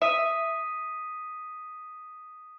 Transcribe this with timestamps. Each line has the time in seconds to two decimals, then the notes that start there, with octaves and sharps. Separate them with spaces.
0.02 E5 D#6 B6 D#7